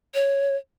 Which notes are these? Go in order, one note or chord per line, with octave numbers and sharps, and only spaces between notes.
C#5